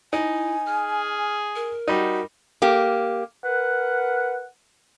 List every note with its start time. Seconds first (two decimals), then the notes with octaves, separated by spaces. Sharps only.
0.13 D#4 E4 G#5
0.67 G#4 F6
1.56 A#4
1.88 G3 D#4 F#4
2.62 A#3 G4
3.44 A#4 B4 F#5